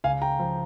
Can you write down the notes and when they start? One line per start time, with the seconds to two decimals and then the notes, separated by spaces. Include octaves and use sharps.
0.04 C#2 F5 G#5
0.22 G5 A#5
0.39 F3